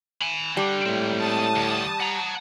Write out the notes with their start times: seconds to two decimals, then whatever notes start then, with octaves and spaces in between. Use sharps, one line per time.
0.22 G#5 B5
0.57 D3 G3 D4
0.86 A2 G#3 C4
1.20 A5 D#6
1.56 D2
2.00 F#5 A#5